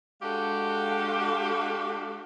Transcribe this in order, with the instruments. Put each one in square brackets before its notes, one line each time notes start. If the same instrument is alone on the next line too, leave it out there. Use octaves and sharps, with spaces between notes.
[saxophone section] G#3 D4 F#4 G4 A4 F5